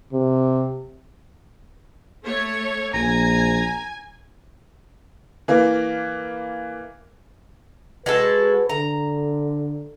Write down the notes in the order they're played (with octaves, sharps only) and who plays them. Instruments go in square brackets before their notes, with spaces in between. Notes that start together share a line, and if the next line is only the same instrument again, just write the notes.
[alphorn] C3
[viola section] A3 C#5
[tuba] A#1 [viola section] G#5 [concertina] A#5
[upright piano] E3 A#3
[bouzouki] G#3 F#4 A4 [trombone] B4
[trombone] D3 [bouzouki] A#5